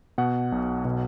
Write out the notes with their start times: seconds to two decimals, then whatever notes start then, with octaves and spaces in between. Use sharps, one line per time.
0.18 B2 F#5
0.52 B1
0.85 B2